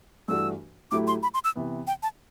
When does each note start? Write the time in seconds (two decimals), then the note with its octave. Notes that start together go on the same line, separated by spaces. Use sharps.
0.28 G2 E3 A3 D4 F#4 E6
0.91 A2 F#3 A3 E4 G4 D6
1.07 C6
1.23 B5
1.34 C6
1.44 E6
1.56 C3 E3 B3
1.87 G5
2.03 A5